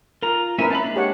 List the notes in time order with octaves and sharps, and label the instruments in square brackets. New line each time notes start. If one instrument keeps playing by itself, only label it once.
[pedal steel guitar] F4 A#5 [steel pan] A#4
[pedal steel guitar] A#3 C#4 E5 [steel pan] E4 A#4 B4
[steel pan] A#3 E5 A5 [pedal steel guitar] C#4 B4 B5
[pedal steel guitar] G#3 D4
[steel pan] G4 C#5 F#5